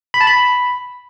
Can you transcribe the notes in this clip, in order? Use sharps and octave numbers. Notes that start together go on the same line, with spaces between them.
B5
A5
B5